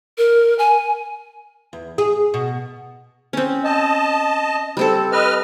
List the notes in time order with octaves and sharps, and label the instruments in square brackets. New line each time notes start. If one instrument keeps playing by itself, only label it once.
[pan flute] A#4
G#5
[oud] E2
G#4
B2
[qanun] C4 C#4
[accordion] D#5 A5
[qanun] G3 C4 A4
[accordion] B4 D#5 F6